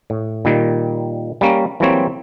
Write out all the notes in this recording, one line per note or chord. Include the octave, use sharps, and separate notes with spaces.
A2
A#2 D#3 G3
G3 A#3 C#4 A#4
E3 F#3 G3 A#3 C4 C#5